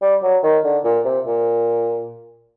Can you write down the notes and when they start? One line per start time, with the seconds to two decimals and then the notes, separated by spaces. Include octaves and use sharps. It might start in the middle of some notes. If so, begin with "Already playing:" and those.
0.02 G3
0.23 F#3
0.43 D#3
0.64 D3
0.84 A#2
1.05 C3
1.26 A#2